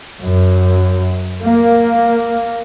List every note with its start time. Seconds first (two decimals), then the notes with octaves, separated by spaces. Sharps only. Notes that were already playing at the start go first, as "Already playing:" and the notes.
0.20 F#2
1.40 A#3